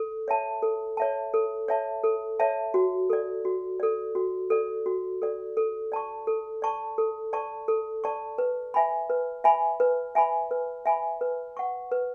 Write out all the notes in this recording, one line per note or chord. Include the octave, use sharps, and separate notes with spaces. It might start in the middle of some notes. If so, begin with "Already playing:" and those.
Already playing: A4
C#5 E5 A5
A4
C#5 E5 A5
A4
C#5 E5 A5
A4
C#5 E5 A5
F#4
A4 D5
F#4
A4 D5
F#4
A4 D5
F#4
A4 D5
A4
D5 A5 C#6
A4
D5 A5 C#6
A4
D5 A5 C#6
A4
D5 A5 C#6
B4
E5 G#5 B5
B4
E5 G#5 B5
B4
E5 G#5 B5
B4
E5 G#5 B5
B4
F#5 C#6
B4